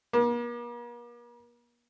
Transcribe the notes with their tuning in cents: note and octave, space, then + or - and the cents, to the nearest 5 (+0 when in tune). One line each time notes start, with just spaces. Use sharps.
A#3 +45